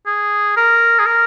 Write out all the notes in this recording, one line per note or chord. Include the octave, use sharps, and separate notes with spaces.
G#4
A#4
G#4
A#4